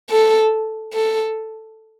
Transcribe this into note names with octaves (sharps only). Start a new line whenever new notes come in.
A4
A4